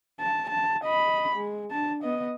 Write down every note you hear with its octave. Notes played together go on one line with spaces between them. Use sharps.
A5
A5
D#5 B5
G#3
D4 A5
B3 D#5